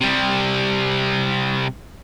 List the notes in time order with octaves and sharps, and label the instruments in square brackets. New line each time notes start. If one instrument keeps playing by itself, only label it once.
[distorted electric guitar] C3 G3